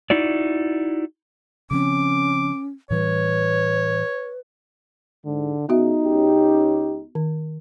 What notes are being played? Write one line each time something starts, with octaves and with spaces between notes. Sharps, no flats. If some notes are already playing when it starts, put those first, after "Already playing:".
D#4 E4 F#4 D5
C#3 F3 C4 C#4 D6
A2 E3 G3 B4 C#5
G#2 D3
C#3 B3 D#4 F#4 E5
C#2 C#4 G4
D#3